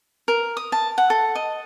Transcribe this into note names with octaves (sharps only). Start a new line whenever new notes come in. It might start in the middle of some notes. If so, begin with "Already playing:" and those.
A#4
D#6
A5
F#5
A4
D#5